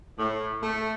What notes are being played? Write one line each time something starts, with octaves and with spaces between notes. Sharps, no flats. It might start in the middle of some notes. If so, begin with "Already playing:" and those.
A2
A3